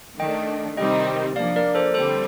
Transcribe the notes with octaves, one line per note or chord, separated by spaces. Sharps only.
D#3 A3 D4 D#5 G5
C3 D#3 G3 C4 D#4 D#5 G5
F3 A#3 D4 D5 F5
A#4 D5
A4 C5
D3 G3 C4 A4 C5